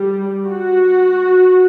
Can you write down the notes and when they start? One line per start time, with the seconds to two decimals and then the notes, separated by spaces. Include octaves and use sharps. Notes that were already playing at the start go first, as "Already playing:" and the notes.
Already playing: G3
0.47 F#4